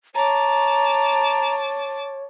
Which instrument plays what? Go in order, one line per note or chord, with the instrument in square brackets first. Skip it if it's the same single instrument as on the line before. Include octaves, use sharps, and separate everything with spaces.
[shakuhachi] C#5 [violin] A5 D6 [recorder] A#5